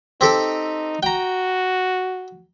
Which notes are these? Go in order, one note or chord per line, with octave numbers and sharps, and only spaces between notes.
C4 D#4 G4 A4
F#4 G5 A#5